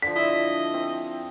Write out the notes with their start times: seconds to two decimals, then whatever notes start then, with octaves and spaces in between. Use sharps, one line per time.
0.02 D3 F3 B6
0.16 E4 D#5 E5
0.74 C4